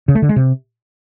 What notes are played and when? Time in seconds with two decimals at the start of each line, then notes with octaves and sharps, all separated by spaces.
0.08 C#3
0.15 A3
0.22 D3
0.29 G#3
0.36 C3